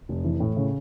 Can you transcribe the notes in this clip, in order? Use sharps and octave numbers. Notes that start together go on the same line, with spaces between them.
F1
E3
A2
C#3